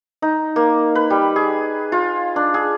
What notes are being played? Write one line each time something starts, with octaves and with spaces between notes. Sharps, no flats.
D#4
A#3
B4
G3
G#4
F4
D4
G#4